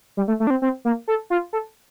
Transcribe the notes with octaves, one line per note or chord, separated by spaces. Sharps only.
G3
A3
A3
D4
C4
C4
A#3
A4
F4
A4